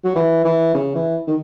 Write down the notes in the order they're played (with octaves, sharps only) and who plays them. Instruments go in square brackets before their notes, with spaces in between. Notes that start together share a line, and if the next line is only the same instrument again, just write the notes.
[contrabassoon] F#3
E3
E3
C#3
E3
D#3